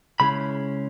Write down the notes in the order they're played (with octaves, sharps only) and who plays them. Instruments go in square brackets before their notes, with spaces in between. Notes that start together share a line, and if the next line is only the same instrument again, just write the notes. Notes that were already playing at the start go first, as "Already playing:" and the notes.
[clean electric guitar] C#3 G#3 C#4 E4 B5